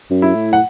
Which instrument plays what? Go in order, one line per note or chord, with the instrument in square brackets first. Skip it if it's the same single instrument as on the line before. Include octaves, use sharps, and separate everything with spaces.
[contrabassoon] F#2
[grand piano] E4
[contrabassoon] A2
[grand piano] F#5